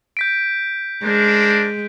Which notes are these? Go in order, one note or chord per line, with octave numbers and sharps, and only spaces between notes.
G6 B6 D7
G#3 D4 A#4 C5